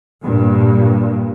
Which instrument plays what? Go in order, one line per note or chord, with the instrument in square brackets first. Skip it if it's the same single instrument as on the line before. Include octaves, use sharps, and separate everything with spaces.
[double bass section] G2 A#2